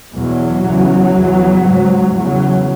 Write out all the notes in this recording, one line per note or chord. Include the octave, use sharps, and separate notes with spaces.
E2 B2 F#3
E2 C#3
E2 C#3
G#2
E2 C#3 F#3